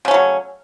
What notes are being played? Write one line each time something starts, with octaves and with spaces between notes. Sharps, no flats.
C#3 F#3 A3 C#4